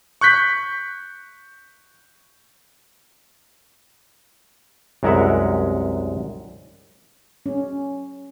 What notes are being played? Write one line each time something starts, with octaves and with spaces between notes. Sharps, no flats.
C#6 F#6 G6 B6
C2 F#2 G#3 A#4 E5 F#5
C#4